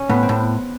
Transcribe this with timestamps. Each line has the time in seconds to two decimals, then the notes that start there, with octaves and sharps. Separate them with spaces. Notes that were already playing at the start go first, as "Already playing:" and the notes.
Already playing: C#4
0.10 A2 B3
0.23 C4
0.29 A2